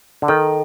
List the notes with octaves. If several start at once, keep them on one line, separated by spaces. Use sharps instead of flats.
D3
D#3 A4